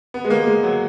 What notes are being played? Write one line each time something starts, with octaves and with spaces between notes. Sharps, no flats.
B3
G#3
A#3
G#3
F#3